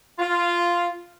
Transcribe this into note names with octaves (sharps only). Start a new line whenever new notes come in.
F4